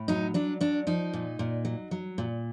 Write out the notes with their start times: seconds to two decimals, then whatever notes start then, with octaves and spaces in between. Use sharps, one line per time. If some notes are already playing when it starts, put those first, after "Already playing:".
Already playing: A2
0.08 F#3 D#4
0.34 F#3 D4
0.61 F#3 D4
0.87 F3 D#4
1.13 A#2
1.39 A#2
1.65 F#3
1.91 F#3
2.18 A#2